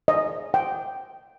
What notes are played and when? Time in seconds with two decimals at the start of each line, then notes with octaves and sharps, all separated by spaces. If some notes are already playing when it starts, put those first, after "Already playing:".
0.08 D#5
0.54 G5